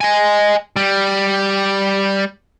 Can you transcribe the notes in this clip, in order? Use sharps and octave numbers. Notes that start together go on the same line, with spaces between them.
D#5 G#5
G3